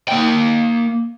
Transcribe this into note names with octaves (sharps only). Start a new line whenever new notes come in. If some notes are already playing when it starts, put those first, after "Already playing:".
A#3 G5